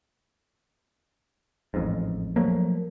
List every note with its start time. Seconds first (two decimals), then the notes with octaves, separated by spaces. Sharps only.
1.74 A1 F2 G#2
2.36 F3 F#3 A3 A#3